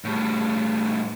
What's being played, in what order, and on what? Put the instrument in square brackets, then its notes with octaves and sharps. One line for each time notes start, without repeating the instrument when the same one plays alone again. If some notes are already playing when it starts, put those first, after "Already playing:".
[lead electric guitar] A2 G3